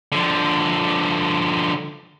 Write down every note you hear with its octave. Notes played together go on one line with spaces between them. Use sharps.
D3 F3